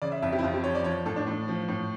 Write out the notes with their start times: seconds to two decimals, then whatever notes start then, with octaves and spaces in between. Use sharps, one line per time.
0.02 C#3 D5
0.12 E5
0.22 F2 E5
0.33 G4
0.39 E4
0.43 F2 F4
0.54 G4
0.64 F3 C#5
0.75 D5
0.84 F3 C#5
1.06 A2 A4
1.16 D4
1.27 A2
1.48 F3
1.68 A2